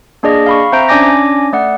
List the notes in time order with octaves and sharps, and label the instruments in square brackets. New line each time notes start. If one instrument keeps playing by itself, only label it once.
[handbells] A#3 D4 G#4 D5 D#5
F5 B5 C#6
C4 C5 E5 A#5 G6 D7
C#4 D4 D5 G#5 D6 A#6
A3 D5 F#5